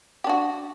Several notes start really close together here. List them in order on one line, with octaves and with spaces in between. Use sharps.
G4 D4 F#4